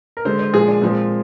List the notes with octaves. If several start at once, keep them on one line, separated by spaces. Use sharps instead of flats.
A#4
D3 G#3 C5
C5
A#2 F3 G#3 G#4
D4
A#2 F3 G#3 C4